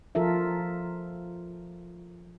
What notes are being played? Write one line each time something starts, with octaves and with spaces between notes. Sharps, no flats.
F3 F4 A4 A#4 E5